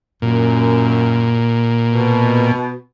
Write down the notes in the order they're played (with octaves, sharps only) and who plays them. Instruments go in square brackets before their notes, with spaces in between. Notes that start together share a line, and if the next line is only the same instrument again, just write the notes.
[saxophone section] F#2 [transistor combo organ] A#2
[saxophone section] B2